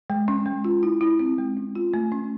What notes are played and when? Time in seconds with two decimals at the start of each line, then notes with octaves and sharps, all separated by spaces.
0.10 G#3
0.28 C#4
0.46 G#3
0.65 F4
0.83 E4
1.01 E4
1.19 C4
1.38 G#3
1.57 C#4
1.75 F4
1.94 A3
2.12 C#4